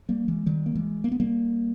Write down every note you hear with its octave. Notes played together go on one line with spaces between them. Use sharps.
G3 A#3
E3 G#3
D#3 G3
A#3
E3 G#3
A#3
B3
G3 A#3